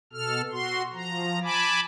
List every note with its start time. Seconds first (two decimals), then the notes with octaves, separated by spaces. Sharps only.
0.13 B2 A4 F6
0.51 F#4 C6
0.93 F3 A#5
1.43 G#5 A5 B5 D6